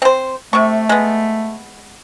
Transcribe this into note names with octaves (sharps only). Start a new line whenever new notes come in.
C4 C5
C3 A3 C#6
G#3 B3